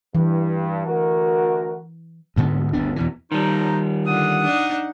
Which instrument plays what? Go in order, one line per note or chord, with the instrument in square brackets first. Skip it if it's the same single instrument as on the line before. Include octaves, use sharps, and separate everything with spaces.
[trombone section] G2 [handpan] E3
[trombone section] D2 F#4 A#4
[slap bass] D2 G#2 D3 B3
G1 D2 B3 D4
E2 B2 E3
[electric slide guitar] D#3 G3 [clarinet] D#4 [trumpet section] C5 A5 A#5
[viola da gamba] D3 F4 [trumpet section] F#5 [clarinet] D#6
[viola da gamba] D4 D#4